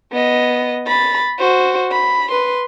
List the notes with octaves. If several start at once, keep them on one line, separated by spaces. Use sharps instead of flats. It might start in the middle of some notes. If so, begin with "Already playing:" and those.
B3 D#5
B5 A6
F#4 C5
B5
B4 C6